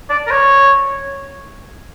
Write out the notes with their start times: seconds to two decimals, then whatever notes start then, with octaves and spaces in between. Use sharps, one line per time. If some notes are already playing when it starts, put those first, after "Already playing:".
0.10 D5
0.27 A#4
0.31 C#5